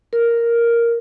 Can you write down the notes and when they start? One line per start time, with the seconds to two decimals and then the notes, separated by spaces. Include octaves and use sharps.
0.13 A#4